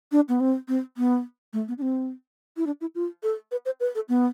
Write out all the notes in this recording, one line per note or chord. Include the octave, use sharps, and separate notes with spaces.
D4
B3
C4
C4
B3
A3
B3
D4
C4
E4
D4
E4
F4
A4
B4
C5
B4
A4
B3